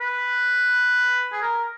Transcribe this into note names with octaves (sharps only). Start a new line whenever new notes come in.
B4
G#4
A#4